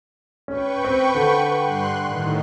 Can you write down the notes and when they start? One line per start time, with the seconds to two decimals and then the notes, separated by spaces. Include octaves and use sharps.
0.48 C#4 B4 G5 C#6
0.84 C4
1.15 D3
1.62 G2 C6 F#6
2.03 A2 D#3